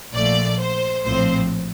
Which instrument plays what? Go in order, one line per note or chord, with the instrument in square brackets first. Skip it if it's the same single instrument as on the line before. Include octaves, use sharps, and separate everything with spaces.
[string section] A#1 A#2 F3 A3 D5
C5
A#1 A2 F3 C4 C5